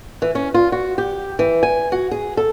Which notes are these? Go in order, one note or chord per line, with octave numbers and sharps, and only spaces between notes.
E3
C#4
F4
F#4
G4
E3
G#5
F#4
G#4
A4